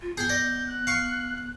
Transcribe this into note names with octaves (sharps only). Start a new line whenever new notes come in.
F4
B3 G#4 G#5 G6
D5 D#5
F#6
F5 C#6